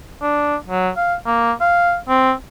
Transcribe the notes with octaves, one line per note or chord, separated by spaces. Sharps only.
D4
F#3
F5
A#3
F5
C4